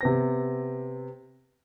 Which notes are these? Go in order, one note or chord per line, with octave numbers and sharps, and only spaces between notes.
C3 B3 A#6